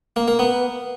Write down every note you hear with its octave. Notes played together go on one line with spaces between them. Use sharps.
A#3
A#3
B3